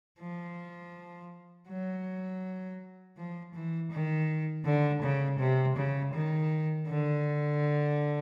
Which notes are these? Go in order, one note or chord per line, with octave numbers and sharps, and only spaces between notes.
F3
F#3
F3
E3
D#3
D3
C#3
C3
C#3
D#3
D3